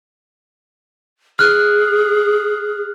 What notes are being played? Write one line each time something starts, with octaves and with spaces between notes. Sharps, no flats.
G#4 F6 F#6